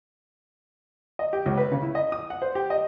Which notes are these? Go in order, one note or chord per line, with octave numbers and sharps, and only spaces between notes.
D#5
G4
C#2
B4
C#3
E4
D#5
D#6
F#5
C5
G4
D#5